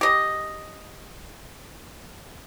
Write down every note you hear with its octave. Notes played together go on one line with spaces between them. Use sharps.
G4 D#5